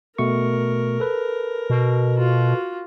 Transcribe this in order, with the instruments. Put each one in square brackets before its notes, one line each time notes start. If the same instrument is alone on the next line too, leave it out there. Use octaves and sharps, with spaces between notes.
[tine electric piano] B2 A3 C#6 [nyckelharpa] A#4
[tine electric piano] A4 B4
[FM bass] B2
[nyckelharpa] F4 F#4